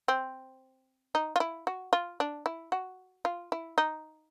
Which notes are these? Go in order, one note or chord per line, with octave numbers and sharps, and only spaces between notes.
C4
D#4
F4
E4
F#4
F4
D4
E4
F#4
F4
E4
D#4